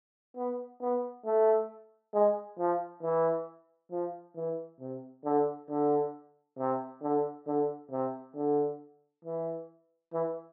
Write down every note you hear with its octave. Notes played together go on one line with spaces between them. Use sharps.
B3
B3
A3
G#3
F3
E3
F3
E3
C3
D3
D3
C3
D3
D3
C3
D3
E3
E3